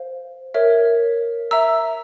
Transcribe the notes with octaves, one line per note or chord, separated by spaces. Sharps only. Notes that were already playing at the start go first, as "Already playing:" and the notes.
Already playing: C5 F5
A#4 C#5 E5
E5 A#5 E6